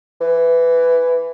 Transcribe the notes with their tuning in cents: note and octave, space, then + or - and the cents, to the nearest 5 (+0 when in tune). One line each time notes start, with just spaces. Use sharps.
E3 +10